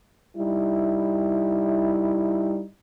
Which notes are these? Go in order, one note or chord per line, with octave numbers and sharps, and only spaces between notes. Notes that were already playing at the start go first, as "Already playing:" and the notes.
G3 D#4 E4